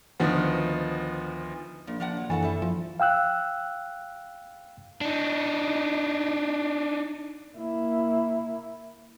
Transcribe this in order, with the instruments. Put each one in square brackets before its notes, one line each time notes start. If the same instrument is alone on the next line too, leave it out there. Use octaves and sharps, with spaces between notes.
[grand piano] D2 D#3 F3 B3
[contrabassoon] A#1 [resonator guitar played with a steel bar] A#2
[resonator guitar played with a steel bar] F3 D4 F#5
F#3
[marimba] F#2 [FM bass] E3 [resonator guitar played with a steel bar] F#4 A4 F#5
[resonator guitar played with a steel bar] G3 A4 E5
[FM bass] F3
[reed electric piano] F5 G5 E6 F#6
[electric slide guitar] D4 D#4
[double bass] A#3 E4